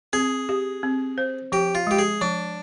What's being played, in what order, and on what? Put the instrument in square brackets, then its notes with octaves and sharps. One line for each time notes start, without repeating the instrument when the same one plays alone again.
[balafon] C4 [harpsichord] G#4
[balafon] G4
C4
C5
[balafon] F3 [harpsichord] G4
[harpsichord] F4
[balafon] G#3 [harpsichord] G4
[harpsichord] G#4
[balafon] F3 [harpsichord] D4